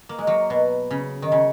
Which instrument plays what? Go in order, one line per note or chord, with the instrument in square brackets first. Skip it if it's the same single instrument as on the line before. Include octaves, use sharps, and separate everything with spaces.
[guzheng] A#3
G#3
F#3 A#3
B2
C#3
D#3
C#3